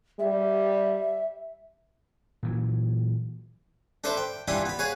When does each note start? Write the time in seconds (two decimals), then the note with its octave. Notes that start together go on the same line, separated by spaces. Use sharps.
0.19 G3 E5
2.43 A#2 E3 F#3
4.04 D4 A4 B4 C5 E5
4.17 G5
4.48 E3 G3 D4 E4 F4 D#6
4.65 B3 B5
4.79 G#4 B4 C#5 F5 F#5 G#5